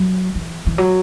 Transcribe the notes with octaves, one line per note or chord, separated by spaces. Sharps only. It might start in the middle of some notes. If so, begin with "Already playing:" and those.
Already playing: F#3
E3
E3
F#3